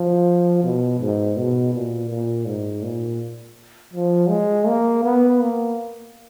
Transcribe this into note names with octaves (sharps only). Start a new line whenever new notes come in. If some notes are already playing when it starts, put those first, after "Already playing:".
Already playing: F3
B2
G#2
B2
A#2
A#2
G#2
A#2
F3
G#3
A#3
B3
A#3